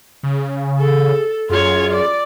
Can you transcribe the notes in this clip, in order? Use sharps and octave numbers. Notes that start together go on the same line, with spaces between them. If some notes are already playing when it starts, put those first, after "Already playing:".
C#3
G#4 A4
F#2 F4 G#4 C#5
D5